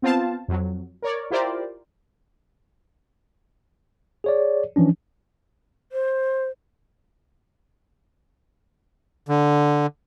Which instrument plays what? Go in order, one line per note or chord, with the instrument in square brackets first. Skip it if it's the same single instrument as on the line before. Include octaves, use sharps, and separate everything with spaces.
[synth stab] B3 C4 F4 C5 F5 A5
F2 F#3
A#4 C#5 D5
E4 F4 G4 A#4 C5 D5
[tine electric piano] G#4 C#5 D5
E3 F3 C#4 D4
[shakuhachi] C5
[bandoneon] D3